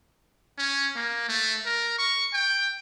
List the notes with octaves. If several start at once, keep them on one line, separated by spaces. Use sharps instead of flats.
C#4
A#3
A3
A#4
C#6
G5